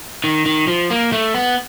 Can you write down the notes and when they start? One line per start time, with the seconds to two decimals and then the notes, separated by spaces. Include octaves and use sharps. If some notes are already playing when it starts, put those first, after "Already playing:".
0.24 D#3
0.46 D#3
0.67 F3
0.90 A#3
1.12 A3
1.34 B3